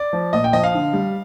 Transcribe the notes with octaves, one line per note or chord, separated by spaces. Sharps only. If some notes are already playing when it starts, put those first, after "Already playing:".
Already playing: D5
F3
A#2 D#5
G5
F3 D#5
F5
D3
G3